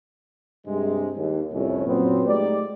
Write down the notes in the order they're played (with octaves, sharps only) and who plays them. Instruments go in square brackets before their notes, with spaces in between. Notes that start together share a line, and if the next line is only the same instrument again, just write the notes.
[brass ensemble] G2 C3 G#3
D#2
C2 F2 A2 C#4
F#2 A#2 F#3 B3 C4
G#3 A3 D#4 G4 D5